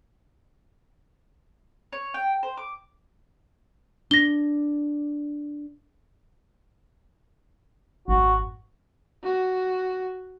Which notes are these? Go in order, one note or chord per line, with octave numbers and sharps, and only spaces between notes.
C#5
G5
C5
D6
D4 A#6 G7
G#1 F2 F#4
F#4